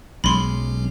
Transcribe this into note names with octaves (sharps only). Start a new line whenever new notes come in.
B1 F#3 G#3 C#4 B5 C6